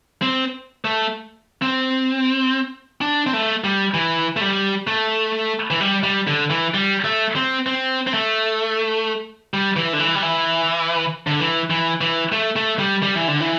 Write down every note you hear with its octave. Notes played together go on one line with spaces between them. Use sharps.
C4
A3
C4
D4
C4
A3
G3
E3
A3
G3
A3
E3
G3
G3
D3
E3
G3
A3
C4
C4
C4
A3
G3
E3
D3
E3
G3
E3
D3
E3
E3
E3
A3
A3
G3
G3
E3
D3
E3